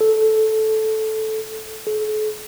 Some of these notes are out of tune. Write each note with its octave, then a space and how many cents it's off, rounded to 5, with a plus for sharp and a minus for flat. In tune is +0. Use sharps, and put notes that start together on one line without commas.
A4 -10
A4 -45